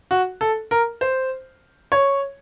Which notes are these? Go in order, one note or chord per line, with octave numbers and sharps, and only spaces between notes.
F#4
A4
A#4
C5
C#5